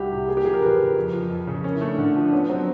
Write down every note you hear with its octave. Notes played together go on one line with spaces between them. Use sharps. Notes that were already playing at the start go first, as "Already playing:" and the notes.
Already playing: C2 E4 F#4 G4
C3
A#3 G#4
G4
F3 G#4
A#4
E2 B4
C#3
F2
F3
F2
C#3
C#4 A#4
E4
A3
D4
D3 D4
F3
D4
B3 C#4
F#3 C4